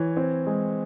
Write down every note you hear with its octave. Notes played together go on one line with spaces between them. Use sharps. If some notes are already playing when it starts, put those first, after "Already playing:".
Already playing: E3 C#5
C4
G#3